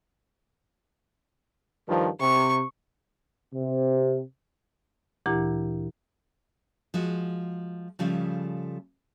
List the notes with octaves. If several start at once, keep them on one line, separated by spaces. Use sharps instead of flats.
G2 D#3 F3
C3 C#6
C3
D2 A#2 E3 E4 G4 A#5
F3 G#3 F#4
C#3 F3 G3 A3